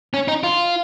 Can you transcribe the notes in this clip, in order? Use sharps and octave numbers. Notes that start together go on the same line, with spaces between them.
C#4
D#4
F4